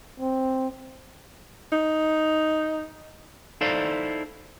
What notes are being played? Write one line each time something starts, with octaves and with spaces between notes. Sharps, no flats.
C4
D#4
D#4 E4 A4 C5 D5 F5